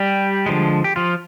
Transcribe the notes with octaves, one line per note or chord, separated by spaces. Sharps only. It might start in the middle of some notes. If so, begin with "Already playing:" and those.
Already playing: G3 G4
D3 F3 G#3
G4
F3 F4